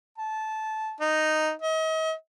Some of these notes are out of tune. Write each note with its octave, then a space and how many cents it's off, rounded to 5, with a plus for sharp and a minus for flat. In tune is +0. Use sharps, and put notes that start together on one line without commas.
A5 -15
D#4 -5
D#5 +40